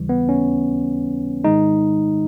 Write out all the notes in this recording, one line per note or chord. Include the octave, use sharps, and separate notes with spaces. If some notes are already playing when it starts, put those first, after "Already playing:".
Already playing: D#2 C#3 E3 G3
B3
C#4
G#2 D#3 G#3 D#4